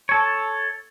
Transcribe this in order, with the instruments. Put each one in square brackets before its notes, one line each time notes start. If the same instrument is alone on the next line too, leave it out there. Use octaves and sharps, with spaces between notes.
[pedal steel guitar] A4 C#5